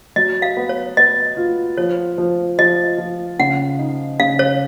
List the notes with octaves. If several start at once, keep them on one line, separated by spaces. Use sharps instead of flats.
F#3 D#5
F5
B3
C#5
B3 D#5
F4
F3 C#5
F3
F3 D#5
F3
C#3 F#5
D#4
C#3 F5
C#5